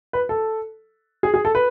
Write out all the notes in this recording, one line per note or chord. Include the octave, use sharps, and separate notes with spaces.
B4
A4
G#4
G#4
A4
B4